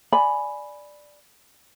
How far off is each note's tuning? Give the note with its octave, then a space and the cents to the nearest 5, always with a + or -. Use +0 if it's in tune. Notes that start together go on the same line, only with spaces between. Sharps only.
D5 +0 G#5 +10 B5 +0